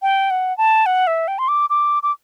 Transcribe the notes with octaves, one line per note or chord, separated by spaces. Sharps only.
G5
F#5
A5
F#5
E5
G5
C6
D6
D6
D6